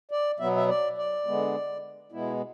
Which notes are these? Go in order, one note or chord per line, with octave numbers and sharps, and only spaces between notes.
D5
B2 F#3 B3 E5
E5
D5
D5
D3 G#3 B3
B2 G#3 B3 E4